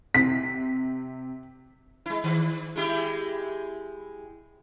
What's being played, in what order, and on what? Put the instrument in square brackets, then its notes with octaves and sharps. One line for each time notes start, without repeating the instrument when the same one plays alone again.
[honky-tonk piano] C3 [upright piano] B6
[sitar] G#3 E4
D#3
G#3 E4 G4